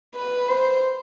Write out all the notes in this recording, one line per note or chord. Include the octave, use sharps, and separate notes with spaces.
B4
C5